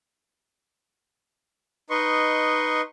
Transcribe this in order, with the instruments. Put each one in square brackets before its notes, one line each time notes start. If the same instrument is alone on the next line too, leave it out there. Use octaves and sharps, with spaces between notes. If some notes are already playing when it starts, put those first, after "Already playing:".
[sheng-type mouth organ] D#4 B4 D#5 C6 C#6